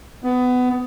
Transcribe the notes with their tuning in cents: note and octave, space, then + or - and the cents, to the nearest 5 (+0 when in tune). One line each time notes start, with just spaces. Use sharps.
B3 +20